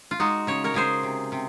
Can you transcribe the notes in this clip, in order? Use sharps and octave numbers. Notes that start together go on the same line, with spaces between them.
F4
G#3 D#4 F#4
C#3 C#5
A#4 C#5
C#3 G#4 C5
C3
C3